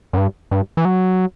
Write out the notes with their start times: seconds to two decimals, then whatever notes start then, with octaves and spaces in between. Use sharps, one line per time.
0.13 F#2
0.17 G2
0.51 G2
0.77 E3
0.85 F#3